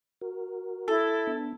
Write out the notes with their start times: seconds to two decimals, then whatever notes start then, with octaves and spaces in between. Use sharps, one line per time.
0.21 F#4 A#4
0.88 E4 A4
1.27 B3 D4